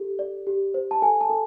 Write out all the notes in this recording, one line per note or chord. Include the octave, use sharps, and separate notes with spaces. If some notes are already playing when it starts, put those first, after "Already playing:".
Already playing: G4 A4
D5
G4
C5
A5
A4 G#5
A5
A4